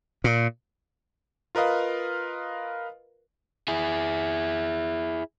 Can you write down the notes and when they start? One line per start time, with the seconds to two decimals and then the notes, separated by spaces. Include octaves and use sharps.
0.24 A#2
1.55 F4 A#4 B4 D#5 F5
3.68 E4 G#4